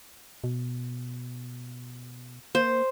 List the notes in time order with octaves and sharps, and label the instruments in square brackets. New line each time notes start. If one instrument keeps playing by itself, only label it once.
[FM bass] B2
[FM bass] A#3 [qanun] C5